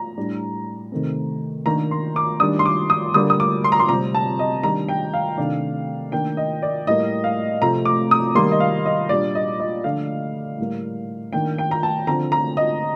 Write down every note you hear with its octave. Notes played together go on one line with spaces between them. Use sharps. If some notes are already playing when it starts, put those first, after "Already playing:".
Already playing: A#5
A2 G3 D4
C3 D#3 A3 C4
D#3 A#3 D4 A#5
C6
D6
D#3 G3 D4 D#6
C6
D6
D#6
D3 G3 A#3 D4 D#6
D#6
D6
C6
A#5
C6
C3 G3 C4 A#5
A5
D#5
D#3 G3 D4 A#5
G5
F5
C3 D#3 A3 D4
D#3 A#3 D4 G5
D#5
D5
A2 G3 A#3 D#5
F5
C3 F3 A3 C4 A#5
D6
D#6
D#3 G3 A#3 C6
D#5
F5
D#5
A#2 G3 D4 D5
D#5
D#5
D3 F3 A3 D4 F5
A2 G3 A#3
D#3 A#3 D4 G5
G5
A#5
A5
D3 F3 C4 A#5
A#5
D#5